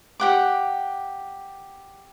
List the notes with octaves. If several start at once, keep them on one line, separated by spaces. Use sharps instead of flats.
G4 F#5 D6